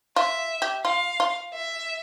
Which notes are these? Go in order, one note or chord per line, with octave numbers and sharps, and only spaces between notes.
F4 E5
G4
F4 F5
F4
E5